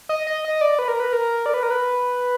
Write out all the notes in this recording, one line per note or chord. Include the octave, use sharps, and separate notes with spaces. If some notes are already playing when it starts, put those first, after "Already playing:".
D#5
D#5
D#5
D5
B4
A#4
B4
A#4
D5
B4
A#4
B4